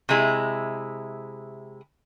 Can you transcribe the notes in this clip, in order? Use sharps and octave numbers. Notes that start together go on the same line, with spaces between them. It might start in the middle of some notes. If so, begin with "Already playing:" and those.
C3 G#3 E4